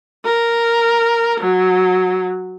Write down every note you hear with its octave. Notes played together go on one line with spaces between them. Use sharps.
A#4
F#3